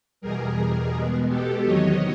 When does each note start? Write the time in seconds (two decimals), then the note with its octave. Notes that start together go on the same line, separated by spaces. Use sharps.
0.21 E2 B2 G3 G#4 A#4
0.93 B2 G#3 B3
1.29 G4 A4
1.64 E2 C3 D#3 F#3 B3 C#5 D#5